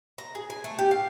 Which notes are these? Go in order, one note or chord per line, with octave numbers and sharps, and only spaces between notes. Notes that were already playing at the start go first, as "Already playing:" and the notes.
A#5
G#4
G#5
A3
G4
F5